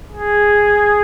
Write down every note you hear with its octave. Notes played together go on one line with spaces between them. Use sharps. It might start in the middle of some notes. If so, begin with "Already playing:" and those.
G#4